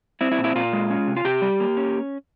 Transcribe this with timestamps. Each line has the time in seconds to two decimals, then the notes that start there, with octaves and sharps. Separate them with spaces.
0.21 C4 E4
0.32 E4
0.38 A#2
0.44 E4
0.55 A#2 F4
0.73 G#3
0.90 C#4
1.07 C3
1.17 F4
1.24 C3 G4
1.42 G3
1.60 A#3
1.77 C#4